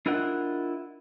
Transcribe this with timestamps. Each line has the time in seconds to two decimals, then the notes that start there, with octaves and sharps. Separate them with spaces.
0.06 D4 E4 F4 A#4 D#5 F#5